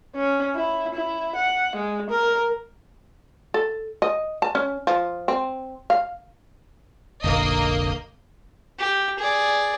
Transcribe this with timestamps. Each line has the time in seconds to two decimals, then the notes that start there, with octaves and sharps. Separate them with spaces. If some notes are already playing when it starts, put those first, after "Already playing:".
0.15 C#4
0.55 E4
0.94 E4
1.36 F#5
1.76 G#3
2.10 A#4
3.54 A4
4.02 D#5
4.42 A5
4.55 C#4
4.87 F3
5.28 C4
5.90 F5
7.24 F1 A#1 D3 A#3 D#5
8.79 G4
9.19 G#4 D5